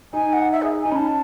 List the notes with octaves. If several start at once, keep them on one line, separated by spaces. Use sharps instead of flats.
D#4 G#5
F#5
E5
G#4
G#5
D#4
C#4 A5 B5